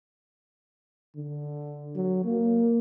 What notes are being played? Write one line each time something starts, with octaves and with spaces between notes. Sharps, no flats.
D3
F#3
A#3